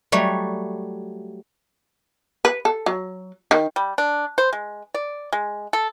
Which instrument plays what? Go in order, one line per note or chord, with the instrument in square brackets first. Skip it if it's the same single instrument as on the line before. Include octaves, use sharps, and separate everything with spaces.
[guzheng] F#3 G3 A3 C#5
[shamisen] B4
A4
F#3
D#3
[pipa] G3
D4
C5
G#3
D5
G#3
A4